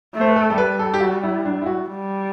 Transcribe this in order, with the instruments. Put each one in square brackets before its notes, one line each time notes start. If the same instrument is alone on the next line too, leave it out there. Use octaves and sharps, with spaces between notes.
[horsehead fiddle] A3
[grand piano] C5
B4
A4
A4
[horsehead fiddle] G3 [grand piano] B4
[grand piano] A4
G4
F#4
E4
D4
E4
F#4
[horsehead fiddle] G3